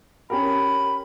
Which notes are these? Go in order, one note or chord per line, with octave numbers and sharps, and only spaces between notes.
C#4 G4 A#4 B5